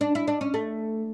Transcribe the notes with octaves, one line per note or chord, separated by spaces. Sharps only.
D4
E4
D4
C#4
A3